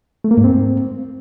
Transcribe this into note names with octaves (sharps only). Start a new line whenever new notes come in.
A3
A#3
G#2
C4